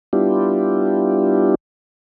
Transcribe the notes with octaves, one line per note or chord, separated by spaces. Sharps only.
G3 B3 D4 E4 F4 G4